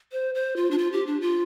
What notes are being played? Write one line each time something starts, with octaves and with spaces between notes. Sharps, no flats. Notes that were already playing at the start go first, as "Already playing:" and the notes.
C5
C5
F4
D4
F4
G4
D4
F4